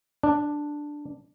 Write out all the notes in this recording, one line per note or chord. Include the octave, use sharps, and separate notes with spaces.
D4